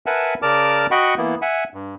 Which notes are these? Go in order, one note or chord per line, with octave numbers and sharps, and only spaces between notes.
A#4 B4 E5 F#5 G#5 A5
C#3 A#4 D5 A5 D6 F6
F#4 D#5 F#5 G5 B5 C#6
E3 A#3 B3 E4
E5 F#5 G#5
G2